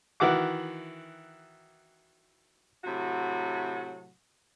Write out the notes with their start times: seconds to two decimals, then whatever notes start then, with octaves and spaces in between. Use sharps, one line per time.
0.20 D#3 E3 F#4 F#5 D6
2.84 A2 C3 F#3 F#4